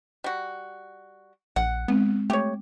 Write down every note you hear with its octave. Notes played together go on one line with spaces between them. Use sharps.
G3 F#4
A#1 F#5
G#3 B3 C4
A3 G4 C#5